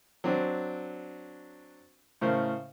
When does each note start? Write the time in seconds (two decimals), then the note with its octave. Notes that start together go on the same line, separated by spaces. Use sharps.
0.24 F#3 C4 D4
2.21 A2 C#3 A#4 C5